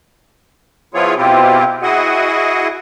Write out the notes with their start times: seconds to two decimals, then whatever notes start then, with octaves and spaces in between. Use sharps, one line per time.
0.94 F3 B3 E4 F4 G#4 C#5
1.17 B2 C4 E4 F4 G4
1.82 E4 F#4 G#4 D#5 F#5